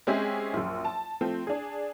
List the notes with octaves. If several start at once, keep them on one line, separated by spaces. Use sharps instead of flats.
G#3 C4 C#4 G4 G#4 E5
A#1 F#2
A5
F3 A3 C4
D4 G#4